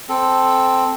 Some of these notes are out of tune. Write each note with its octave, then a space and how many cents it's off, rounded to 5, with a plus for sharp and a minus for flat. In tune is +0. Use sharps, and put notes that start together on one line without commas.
C4 +0 A4 -5